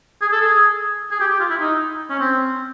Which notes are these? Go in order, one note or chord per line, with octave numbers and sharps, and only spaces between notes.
G#4
A4
G#4
G#4
G4
G4
F4
E4
D#4
C#4
C4